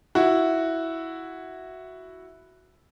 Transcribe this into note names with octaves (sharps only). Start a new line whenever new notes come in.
E4 F#4